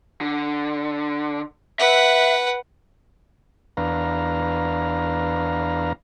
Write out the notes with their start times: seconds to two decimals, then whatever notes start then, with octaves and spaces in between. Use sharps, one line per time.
0.21 D3
1.79 B4 E5 F#5
3.77 E2 D4 B4 F5 A#5